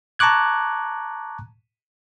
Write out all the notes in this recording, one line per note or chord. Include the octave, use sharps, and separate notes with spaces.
A5 A#5 C#6 D6 F#6 G#6